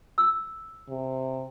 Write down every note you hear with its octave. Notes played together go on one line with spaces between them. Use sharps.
E6
C3